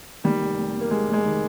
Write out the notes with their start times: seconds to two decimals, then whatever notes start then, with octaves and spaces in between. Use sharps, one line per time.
0.24 D#3 G3
0.40 F1
0.57 F1
0.74 F1
0.81 A#3
0.91 F1 G#3
1.08 F1
1.13 G#3
1.24 D#3